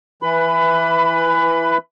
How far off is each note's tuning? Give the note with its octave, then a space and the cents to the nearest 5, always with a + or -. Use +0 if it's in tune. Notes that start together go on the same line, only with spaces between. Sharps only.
E3 +10 B4 +0 B5 +25